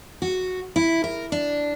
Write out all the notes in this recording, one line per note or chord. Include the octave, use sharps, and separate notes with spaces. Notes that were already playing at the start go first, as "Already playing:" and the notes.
F#4
E4
A#4
D4